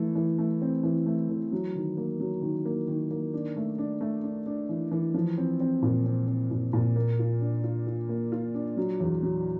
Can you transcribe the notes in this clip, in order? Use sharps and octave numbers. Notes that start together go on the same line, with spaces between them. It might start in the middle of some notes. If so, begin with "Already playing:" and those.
Already playing: E3 A3
E3
A3
C4
E3
A3
E3
F#3
D#3
A#3
F#3
D#3
A#3
D#3
A#3
D4
A3
D4
A3
D4
D4
E3
E3
F3
C4
C4
A#2
C4
C4
A#2
A#2
A#3
F4
D4
F4
F4
A#3
F4
D4
F#3
E2
F#3